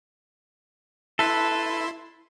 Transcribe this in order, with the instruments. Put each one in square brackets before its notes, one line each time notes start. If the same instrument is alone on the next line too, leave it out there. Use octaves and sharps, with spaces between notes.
[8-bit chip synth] E4 C6 [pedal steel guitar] A4 B4